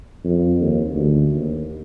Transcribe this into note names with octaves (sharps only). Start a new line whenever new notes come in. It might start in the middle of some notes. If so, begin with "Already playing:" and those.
F2
D#2
D2
D#2